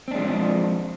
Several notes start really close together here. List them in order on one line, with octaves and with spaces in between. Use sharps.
C4 D4 G#3 F3